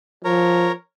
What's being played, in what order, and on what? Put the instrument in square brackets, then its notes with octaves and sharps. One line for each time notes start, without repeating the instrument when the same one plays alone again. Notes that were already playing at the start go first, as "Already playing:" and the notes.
[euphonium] F3 [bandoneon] A#4 C#5 A#5